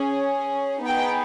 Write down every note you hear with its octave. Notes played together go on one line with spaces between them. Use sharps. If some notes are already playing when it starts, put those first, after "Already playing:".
Already playing: C#4 G#4
B3 D#4 G#4 G5